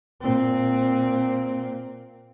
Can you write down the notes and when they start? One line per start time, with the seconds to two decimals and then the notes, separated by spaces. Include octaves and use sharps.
0.21 A#2 C4